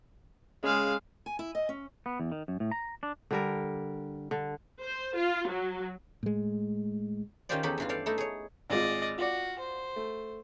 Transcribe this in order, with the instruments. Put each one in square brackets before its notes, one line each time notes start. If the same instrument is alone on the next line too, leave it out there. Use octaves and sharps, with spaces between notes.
[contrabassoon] C#3 [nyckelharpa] G#3 F5
[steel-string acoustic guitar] G#5
E4
D#5
C#4
[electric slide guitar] B3
E2
D#3
F#2
A2
A#5
D4
[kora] D3 G3 A#4
D3
[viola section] C5
F4
F#3
[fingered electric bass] A2 G#3
[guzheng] D#3 C#4 F4 G4 C5 D5
E2 C#4 D#4 G4 A4 B5
G2 E3 F4
A4 D5 F5 G5
A3 D#4 E4 A4
G#4 C#5
[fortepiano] G#1 G#3 F4 [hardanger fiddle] D5 D#5
[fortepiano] F4 D5 [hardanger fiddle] F#4
[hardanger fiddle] C5
[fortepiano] A3